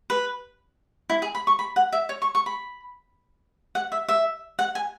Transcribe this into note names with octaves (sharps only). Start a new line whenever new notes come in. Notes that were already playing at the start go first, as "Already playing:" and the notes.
B4
E4
G#4
B5
C#6
B5
F#5
E5
C#5
C#6
C#6
B5
F#5
E5
E5
F#5
G#5